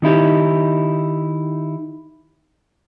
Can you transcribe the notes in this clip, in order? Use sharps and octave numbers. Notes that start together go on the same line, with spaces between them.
D#3 D#4 E4 G4